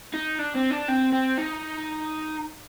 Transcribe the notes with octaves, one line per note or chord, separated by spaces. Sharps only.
D#4
D4
C4
D4
C4
C4
D#4